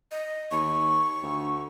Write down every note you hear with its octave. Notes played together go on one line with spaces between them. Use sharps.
D#5
D#2 C#6
D2